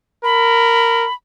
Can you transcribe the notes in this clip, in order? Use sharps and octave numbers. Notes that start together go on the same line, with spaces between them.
A#4 B5